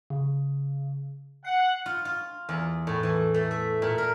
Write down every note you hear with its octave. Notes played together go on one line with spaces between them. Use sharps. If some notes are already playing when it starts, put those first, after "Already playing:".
C#3
F#5 C7
F4
F4
E2
A2
E3
A3
E5
A#2
A#4